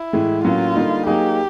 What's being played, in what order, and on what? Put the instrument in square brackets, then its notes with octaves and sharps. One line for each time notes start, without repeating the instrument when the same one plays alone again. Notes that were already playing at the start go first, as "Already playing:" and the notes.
Already playing: [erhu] E4
[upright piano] A2 E3 G#3
[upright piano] A2 F#3 A#3 C#4 [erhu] F4
[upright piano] D3 G3 A#3 D#4
[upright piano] F#3 A#3 D#4 G#4 [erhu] G4